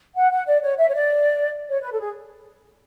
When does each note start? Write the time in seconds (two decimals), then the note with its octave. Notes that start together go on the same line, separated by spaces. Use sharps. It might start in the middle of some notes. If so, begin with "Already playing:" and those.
0.17 F#5
0.32 F#5
0.47 D5
0.63 C#5
0.78 E5
0.88 C#5
0.94 D5
1.71 C#5
1.81 B4
1.92 A4
2.00 G#4